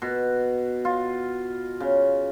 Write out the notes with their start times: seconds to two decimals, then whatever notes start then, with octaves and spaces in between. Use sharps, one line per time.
0.02 B2
0.85 F4
1.80 C#3